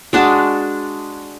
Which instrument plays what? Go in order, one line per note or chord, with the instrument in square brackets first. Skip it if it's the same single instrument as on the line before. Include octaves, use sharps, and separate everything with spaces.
[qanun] G#3 D4 F#4 A5